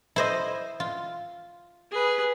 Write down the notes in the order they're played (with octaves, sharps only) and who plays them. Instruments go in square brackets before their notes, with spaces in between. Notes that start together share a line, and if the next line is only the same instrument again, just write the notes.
[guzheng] E4 C5 D#5
F4
[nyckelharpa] G#4 B4